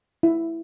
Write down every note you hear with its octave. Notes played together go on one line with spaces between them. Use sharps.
E4